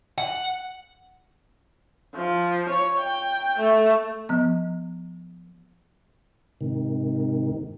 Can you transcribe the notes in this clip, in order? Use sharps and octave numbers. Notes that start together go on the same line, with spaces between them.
F#5
F3
C#5
G5
A3
F3 B3
G#2 C3 D#3